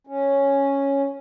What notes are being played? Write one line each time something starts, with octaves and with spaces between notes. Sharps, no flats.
C#4